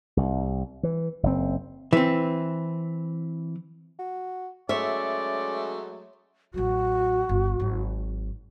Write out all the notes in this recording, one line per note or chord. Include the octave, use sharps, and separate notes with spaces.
C2
E3
F#1 C4
E3 C4
F#4
F#3 G#3 A3 C#4 C#5 D5 E5
A1 F#3 F#4
G1
G#1 F#3